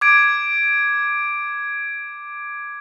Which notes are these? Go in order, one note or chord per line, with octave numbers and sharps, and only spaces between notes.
D6 G#6 D7